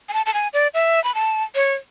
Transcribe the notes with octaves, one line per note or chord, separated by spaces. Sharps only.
G#5
A5
A5
G#5
D5
E5
B5
A5
C#5